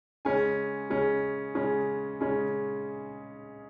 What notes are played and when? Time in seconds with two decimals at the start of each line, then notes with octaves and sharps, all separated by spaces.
0.25 C#3 G#3 C#4 G#5
0.90 C#3 G#3 C#4
1.55 C#3 G#3 C#4
2.21 C#3 G#3 C#4